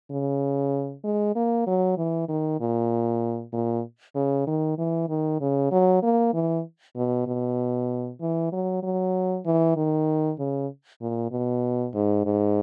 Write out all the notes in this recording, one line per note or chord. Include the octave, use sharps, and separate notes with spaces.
C#3
G#3
A#3
F#3
E3
D#3
A#2
A#2
C#3
D#3
E3
D#3
C#3
F#3
A#3
E3
B2
B2
E3
F#3
F#3
E3
D#3
C#3
A#2
B2
G#2
G#2